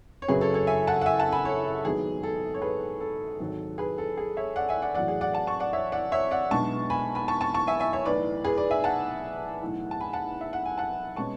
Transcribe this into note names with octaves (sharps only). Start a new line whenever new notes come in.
C#5
F#2 C#3 F#3 C#4 G#4 B4
A4 C#5
A4 C#5
E5 G#5
F#5 A5
F#5
E5 G#5
F#5 A5
G#5 B5
A4 C#5
G#1 G#2 F#3 B3 G#4
A4
C#5
G#4 B4
A4
G#1 G#2 F#3 A4
G#4 B4
A4
G#4
C#5 E5
D5 F#5
E5 G#5
D5 F#5
A1 A2 F#3 D5 F#5
G#4
D5 F#5
F#5 A5
A5 C#6
D5 F#5
C#5 E5
D5 F#5
C#5 E5
D5 F#5
B1 B2 G#3 D4 A5 C#6
G#5 B5
G#5 B5
A5 C#6
A5 C#6
A5 C#6
E5 G#5
E5 G#5
C#5 E5
B1 A2 E3 B4 D5
G#4 B4
B4 D5
E5 G#5
F#5 A5
B1 A2 E3
A5
G#5 B5
F#5 A5
E5
F#5
G#5
F#5 A5
B2 G#3 C#4 A5 C#6